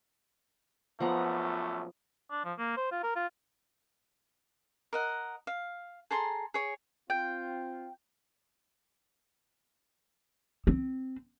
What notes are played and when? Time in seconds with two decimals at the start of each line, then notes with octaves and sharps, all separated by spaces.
1.00 A#1 F#2 F3 A3 B3 A#5
2.31 D4
2.45 F3
2.59 A#3
2.77 C5
2.92 F4
3.03 A#4
3.16 F4
4.93 A#4 D#5 F#5
5.47 F5
6.11 G#4 A4 A#5 C6
6.54 G#4 C#5
7.10 C4 F4 G5
10.67 C4